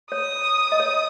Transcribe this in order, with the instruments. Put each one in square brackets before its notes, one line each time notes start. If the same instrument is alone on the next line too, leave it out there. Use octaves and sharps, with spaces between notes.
[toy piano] C#5 [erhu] D#6
[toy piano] D#5
C#5